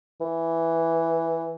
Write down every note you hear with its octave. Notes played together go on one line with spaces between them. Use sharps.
E3